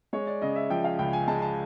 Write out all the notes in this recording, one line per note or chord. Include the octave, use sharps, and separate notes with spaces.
G#3 C#5
D5
C#3 D#5
E5
F3 G5
F5
C#2 G5
G#5
G#3 A5
A5